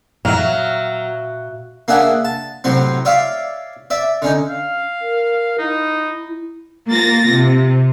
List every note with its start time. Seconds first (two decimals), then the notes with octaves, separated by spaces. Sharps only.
0.25 A#2 F#3 E5 F5
1.88 A#3 D4 G#4 E5 F#5
2.25 A5
2.64 A2 C3 F#3 C4
3.05 C#5 D5 E5 F5
3.90 D5 E5
4.22 D3 C#4 D#4
4.50 F5
5.01 A#4
5.59 D#4 E4
6.88 A#3 F4 A6 A#6
7.31 C3